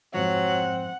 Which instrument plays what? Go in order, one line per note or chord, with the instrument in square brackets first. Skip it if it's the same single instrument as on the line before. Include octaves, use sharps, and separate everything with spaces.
[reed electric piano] F2 G#2 F3 [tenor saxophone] F#3 [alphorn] C4 [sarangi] F#5